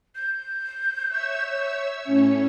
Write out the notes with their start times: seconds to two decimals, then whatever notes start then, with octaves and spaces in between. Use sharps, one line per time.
0.15 G6
1.09 C#5 E5 E6
2.02 A2 C#4 C#5